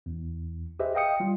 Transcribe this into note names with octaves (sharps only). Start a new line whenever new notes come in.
E2
G4 G#4 B4 C5 D#5 E5
D#5 F5 G5 D#6 C#7
G3 F4